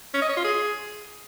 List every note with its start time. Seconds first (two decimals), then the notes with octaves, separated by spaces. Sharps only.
0.14 C#4
0.22 D#5
0.29 C#5
0.37 F4
0.44 G#4